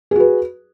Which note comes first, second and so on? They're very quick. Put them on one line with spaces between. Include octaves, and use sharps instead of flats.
G#4 F#4 B4